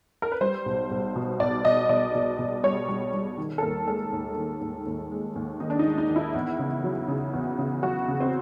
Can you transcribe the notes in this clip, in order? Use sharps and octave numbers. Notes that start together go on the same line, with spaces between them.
A#4
B4
G3 C5
B1
B1
B2
B1 D5
B2 D#5
B2 D5
B2
B2
G3 C#5
G3
G3
D#3
A4
D#2 A#4
G#3 A4
D#2
D#3
D#2
D#2
G#3
D#2
D#3 D#4
D4
D#4
G#3
D#4
D#3
E4
E2
C#3
F#3
C#3
E2
C#3
F#3 F#4
C#3
C4